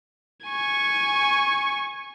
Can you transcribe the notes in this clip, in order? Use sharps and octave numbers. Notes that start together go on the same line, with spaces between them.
G#5 C#6